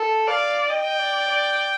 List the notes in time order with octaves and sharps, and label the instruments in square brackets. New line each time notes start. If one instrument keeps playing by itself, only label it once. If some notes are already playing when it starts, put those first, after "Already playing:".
Already playing: [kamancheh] A4
[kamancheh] D5 [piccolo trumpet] F5
[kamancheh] D#5 [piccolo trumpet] G5
[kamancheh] D5
D5